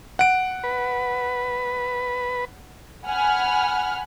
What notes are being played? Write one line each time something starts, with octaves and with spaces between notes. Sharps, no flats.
F#5 D7
B4
F#5 G#5 B5 F6